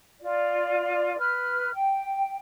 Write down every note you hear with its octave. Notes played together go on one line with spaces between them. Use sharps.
F4 D5
B4 F6
G5